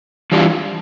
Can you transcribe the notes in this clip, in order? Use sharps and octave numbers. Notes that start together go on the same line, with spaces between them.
E3 G3 D4 F4